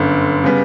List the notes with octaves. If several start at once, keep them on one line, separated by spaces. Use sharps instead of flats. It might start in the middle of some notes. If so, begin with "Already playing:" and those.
Already playing: G1 F#2 D3
C#3 G3 B3